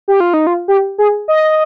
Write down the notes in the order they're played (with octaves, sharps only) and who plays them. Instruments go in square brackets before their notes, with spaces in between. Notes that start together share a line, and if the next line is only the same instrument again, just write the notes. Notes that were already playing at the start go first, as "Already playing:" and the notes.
[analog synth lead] G4
F4
D#4
F4
G4
G#4
D#5